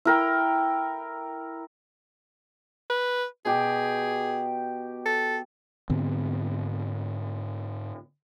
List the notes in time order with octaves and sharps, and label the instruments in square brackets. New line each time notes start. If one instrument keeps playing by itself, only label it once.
[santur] E4 A#4 G5
[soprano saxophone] B4
[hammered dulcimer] B2 G4 [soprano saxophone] G#4
[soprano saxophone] A4
[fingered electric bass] G#2 D3 B3 C4